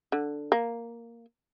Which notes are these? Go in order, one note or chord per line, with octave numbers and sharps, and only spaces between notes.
D3
A#3